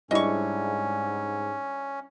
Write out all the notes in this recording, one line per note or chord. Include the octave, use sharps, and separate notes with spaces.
G#2 G3 C#4 D4 E4 D#5 C#6